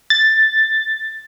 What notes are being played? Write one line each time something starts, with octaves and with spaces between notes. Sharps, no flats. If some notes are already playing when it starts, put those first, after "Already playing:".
A6